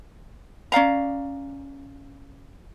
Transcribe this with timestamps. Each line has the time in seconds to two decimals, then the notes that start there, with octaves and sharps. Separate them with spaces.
0.72 C#4 D5 F5 A#5